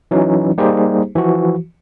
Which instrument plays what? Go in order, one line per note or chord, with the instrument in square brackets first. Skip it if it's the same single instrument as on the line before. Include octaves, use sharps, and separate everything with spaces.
[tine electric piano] E3 F#3 C#4 D#4
G3 A#3 D#4 G4 G#4 C5
E3 F3 F#4